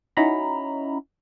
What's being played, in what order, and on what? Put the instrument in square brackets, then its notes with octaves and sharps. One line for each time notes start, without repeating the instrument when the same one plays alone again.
[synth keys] C#4 D#4 E4 F#4 A#5 B5